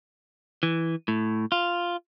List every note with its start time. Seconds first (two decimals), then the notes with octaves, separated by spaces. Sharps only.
0.63 E3
1.08 A2
1.52 F4